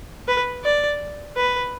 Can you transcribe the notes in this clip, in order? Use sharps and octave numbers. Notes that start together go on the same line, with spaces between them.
B4
D5
B4